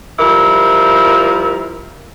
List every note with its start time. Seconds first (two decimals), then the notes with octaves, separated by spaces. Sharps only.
0.20 F3 G3 E4 A#4